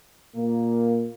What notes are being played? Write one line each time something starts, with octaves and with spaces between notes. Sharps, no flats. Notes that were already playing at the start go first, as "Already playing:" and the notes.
A#2 A#3